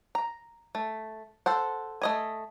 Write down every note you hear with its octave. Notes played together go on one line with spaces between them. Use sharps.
A#5
A3
A4 C5 F#5
A3 D#5 G#5